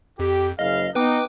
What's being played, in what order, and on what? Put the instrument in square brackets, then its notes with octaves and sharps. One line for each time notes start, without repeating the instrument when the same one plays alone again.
[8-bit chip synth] F2 [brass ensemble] G4
[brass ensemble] F#1 C#3 F5 [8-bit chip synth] D#5
[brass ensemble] B3 D#4 [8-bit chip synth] B4 G5 D6